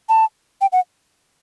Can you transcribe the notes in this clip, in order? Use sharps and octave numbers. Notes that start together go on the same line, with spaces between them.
A5
G5
F#5